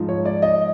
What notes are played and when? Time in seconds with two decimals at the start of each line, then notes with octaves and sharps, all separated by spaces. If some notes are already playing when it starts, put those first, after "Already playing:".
Already playing: G#2 F3
0.09 C#5
0.25 D5
0.42 D#5